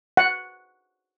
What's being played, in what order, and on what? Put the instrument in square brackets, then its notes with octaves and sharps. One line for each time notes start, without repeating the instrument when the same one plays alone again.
[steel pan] F#5